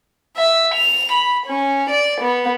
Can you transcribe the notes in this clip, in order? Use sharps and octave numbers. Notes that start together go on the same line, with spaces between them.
E5
F7
B5
C#4
D5
B3